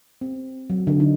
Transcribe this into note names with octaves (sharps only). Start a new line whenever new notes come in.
C4
F#3
D3
D#4